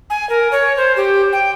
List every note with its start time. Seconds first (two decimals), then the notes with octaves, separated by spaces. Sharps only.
0.10 G#5
0.30 A#4
0.52 C#5
0.77 C5
0.97 G4
1.33 G5